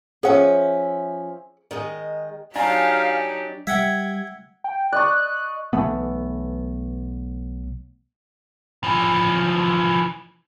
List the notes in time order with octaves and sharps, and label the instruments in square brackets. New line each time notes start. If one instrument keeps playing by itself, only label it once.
[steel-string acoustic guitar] F3 C#4 E5 [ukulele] G#4 F#5
[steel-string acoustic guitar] D#3 G#3 D#5
[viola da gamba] F#3 D#4 G4 [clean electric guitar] D4 [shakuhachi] F5 [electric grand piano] G#5 A#5
[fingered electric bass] G3 [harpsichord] E5 F#5 G5 [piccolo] G#6
[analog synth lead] G5
[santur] D5 D#5 C#6 [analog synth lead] F#6
[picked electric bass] B1 E3 A3 B3
[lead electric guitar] E3 F3